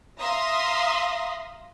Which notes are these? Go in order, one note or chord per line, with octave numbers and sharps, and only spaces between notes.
E5 F5 A#5 C6 D#6 A#6